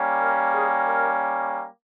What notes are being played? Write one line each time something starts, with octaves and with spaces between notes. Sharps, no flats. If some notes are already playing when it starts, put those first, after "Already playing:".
Already playing: G3 A#3 C#4
A#4
G#4
A#4